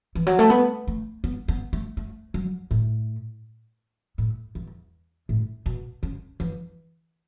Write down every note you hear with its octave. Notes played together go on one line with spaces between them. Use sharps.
E3
F#3
A3
B3
A3
B3
B3
A3
A3
F#3
A2
A2
E2
A2
B2
C#3
E3